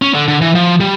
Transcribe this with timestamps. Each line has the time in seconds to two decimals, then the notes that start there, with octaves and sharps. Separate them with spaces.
0.02 C#4
0.15 D3
0.28 D3
0.41 E3
0.55 F3
0.81 G3